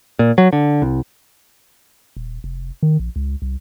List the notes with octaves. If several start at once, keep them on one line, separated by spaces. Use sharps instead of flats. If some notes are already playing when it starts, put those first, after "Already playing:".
A#2
F#3
D3
C2
D#1
F1
D#3
A#1
C#2
C2